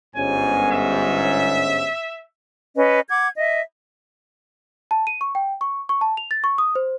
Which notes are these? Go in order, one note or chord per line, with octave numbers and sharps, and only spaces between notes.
G1 G#2 C#4 G#5
E5
C#4 B4 D#5
F#5 D6 G#6
D#5 E5
A5
D#7
C#6
G5
C#6
C#6
A5
F7
A6
C#6
D#6
C5